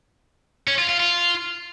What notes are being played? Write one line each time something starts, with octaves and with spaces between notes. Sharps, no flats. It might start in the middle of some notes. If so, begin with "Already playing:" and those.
C#4
F4
F4
F4